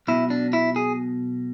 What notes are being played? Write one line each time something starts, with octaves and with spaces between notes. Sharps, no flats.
B1 B2 E4
D4
E4
G#4